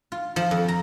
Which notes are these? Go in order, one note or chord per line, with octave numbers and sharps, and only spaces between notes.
F4
F3
F2
A#5